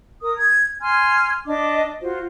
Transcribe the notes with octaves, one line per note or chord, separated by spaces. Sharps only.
A#4 D#6
G#6
G#5 C6 F6 G#6
D4 D#5 D6
F4 F#4 C5